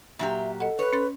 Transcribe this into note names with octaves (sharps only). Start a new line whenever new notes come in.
A#2 F#3 G4 E5
A4 D#5 F#5
B4 C#5
C#4 C6 A6